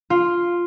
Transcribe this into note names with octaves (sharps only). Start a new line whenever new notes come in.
F4